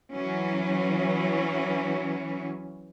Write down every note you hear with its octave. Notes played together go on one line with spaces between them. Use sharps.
E3 F#3 C#4